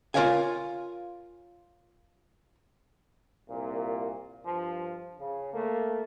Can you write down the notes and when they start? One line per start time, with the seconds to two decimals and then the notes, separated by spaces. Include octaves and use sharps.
0.14 F4 G4 A#4 C#5 F5 G#5
3.49 C2 A#2
4.46 G2 F3
5.19 C#3
5.54 A3 A#3